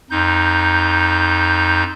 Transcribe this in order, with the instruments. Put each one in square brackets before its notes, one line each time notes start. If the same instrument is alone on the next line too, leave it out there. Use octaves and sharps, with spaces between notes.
[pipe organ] F2 D#4 G6